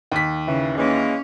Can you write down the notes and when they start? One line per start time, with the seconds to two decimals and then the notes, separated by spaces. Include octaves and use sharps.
0.12 D#2 B6
0.47 C#3 E3
0.77 E3 G#3 A#3 C#4